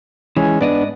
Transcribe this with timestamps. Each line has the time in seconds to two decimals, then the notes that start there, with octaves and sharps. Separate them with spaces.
0.37 E3 G#3 C#4
0.61 G#2 B3 D4 D5 D#5